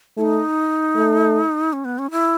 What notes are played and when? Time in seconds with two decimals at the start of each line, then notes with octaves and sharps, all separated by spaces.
0.17 A3 E4
0.21 D#4
0.96 A3
1.73 C#4
1.85 B3
1.98 C#4
2.11 E4